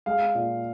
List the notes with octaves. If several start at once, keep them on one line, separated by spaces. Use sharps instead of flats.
G#3 F5
A#2